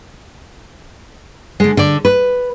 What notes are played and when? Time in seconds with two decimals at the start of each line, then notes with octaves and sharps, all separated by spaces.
1.60 D3 G#3
1.77 D3 D5
2.05 B4